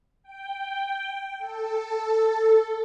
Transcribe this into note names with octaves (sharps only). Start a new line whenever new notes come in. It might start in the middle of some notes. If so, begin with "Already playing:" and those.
G5
A4